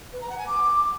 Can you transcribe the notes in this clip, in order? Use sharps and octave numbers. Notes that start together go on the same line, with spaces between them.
B4
A#5
F#5
G#5
D6